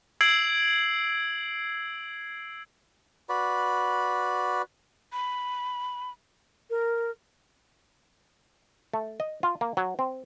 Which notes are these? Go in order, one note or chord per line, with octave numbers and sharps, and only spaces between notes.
E6 G#6 C7 D7 F#7
F#4 B4 D5 B5
B5
A#4
A3
D#5
F4
A#3
F#3
C4